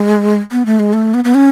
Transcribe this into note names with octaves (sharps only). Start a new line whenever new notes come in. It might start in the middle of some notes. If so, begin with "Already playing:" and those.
Already playing: G#3
B3
A3
G#3
A3
B3
B3
C#4